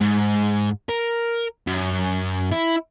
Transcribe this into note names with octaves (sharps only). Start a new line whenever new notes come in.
G#2
A#4
F#2
E4